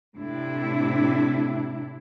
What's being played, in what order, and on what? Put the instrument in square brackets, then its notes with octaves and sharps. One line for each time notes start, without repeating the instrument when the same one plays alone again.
[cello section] A2 C3 D4 E4